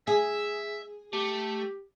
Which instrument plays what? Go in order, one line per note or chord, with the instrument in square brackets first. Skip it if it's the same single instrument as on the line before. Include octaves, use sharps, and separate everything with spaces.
[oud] G#4 [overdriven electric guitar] E5
[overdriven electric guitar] A3 [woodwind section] G4